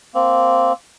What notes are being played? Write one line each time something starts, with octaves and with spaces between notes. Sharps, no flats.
A#3 C4